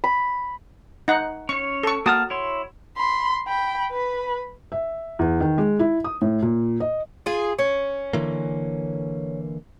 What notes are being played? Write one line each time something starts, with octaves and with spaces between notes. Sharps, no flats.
B5
D#4 F#5
C#4 C#5 C#6
A4 C#6
A#3 F#4 A5 D#6 F6
E4 C#5 C6
B5 C6
G5 B5
B4 B5
E5
E2
D#3
G#3
E4
D#6
A2
A#2
D#5
F4 G#4
C#4
D3 E3 A#3